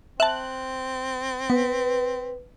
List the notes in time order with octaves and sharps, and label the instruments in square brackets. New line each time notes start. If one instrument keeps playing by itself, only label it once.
[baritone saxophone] C4 [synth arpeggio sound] E5 A5 [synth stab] F#6
[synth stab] B3 [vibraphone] B4